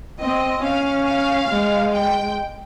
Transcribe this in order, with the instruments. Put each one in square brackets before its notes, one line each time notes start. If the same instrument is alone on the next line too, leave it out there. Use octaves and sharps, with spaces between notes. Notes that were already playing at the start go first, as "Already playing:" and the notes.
[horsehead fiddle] C4 [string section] D#5
[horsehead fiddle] C#4 [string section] F5
[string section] F5
[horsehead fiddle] G#3
[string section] G5